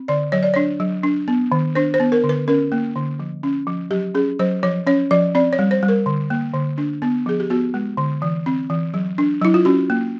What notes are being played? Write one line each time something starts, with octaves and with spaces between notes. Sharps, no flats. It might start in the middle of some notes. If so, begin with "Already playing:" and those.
Already playing: C4
D3 D5
F#3 C#5
D5
D4 C#5
F#3
D4
B3
D#3
D4 C5
C5
B3
A#4
D3
B4
C#4 A#4
A#3
D3
F3
C#4
F3
F#3 G4
C#4 G#4
F#3 C5
F3 C#5
C#4 C#5
F3 D5
C4 D5
C#5
G3
C5
G3
A#4
D3
A#3
D3
D4
B3
F3 G#4
G4
B3 F#4
G#3
D3
E3
C4
E3
F#3
D4
F#3 E4
F4
C#4 F#4
A#3